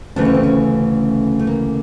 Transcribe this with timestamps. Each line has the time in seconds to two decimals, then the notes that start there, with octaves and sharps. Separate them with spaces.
0.16 D2 C#3 E3 A3 D4
0.25 C#4
0.34 C4
0.43 C#4
1.39 A3
1.47 A#3